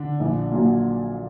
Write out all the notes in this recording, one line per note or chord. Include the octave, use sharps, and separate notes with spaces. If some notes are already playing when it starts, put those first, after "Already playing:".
Already playing: D3 D4
A#1
A#2 F#3